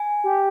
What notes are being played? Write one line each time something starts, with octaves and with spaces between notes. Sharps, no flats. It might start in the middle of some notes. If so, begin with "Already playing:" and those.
Already playing: G#5
G4